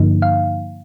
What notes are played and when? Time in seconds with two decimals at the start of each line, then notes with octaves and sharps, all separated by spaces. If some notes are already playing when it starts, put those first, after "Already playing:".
Already playing: G2 D3 F3 A#3 D#4
0.22 F5